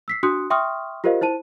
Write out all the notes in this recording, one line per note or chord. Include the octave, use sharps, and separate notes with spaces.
E6 B6 C7
D4 F#4 C6 D#6 F#6 C#7
E5 G5 C6 C#6 D#6 F6
F4 G4 A#4 C5 D#5 F5
E4 C5 A5 D#7